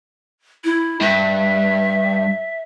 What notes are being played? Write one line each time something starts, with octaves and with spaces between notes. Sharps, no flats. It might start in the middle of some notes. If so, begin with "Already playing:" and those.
E4
G2 E5